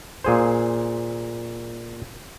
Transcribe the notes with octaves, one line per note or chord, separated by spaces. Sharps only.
A#2 G#4 C5